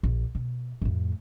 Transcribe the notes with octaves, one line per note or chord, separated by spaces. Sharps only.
A#1
B2
F2 A2